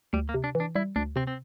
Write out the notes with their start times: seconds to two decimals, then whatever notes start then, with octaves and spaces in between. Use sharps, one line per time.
0.13 D2 G3
0.29 A#3
0.34 C3
0.44 D4
0.55 E3
0.60 D4
0.75 G3 E4
0.96 D2 D4
1.16 C3 C4
1.27 C4